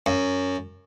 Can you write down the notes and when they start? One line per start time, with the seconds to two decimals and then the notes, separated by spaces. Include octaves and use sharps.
0.06 F#2